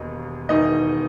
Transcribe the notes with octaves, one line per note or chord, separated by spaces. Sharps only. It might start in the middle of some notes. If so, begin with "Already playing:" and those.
Already playing: E1 D#2 D#5
E1 E2 D#3 D#4 D#5